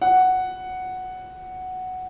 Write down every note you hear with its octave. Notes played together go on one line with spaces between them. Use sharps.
F#5